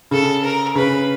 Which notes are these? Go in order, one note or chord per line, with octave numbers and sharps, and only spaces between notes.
C#3 A4
A#4
C#3 B4